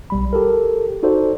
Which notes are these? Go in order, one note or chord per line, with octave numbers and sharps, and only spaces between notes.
B1 G3 B5
G4 A4 A#4
D#4 F#4 A4 C5 D5